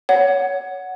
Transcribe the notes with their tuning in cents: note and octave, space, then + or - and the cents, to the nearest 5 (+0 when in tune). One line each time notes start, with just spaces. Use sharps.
C#5 +15 F#5 +0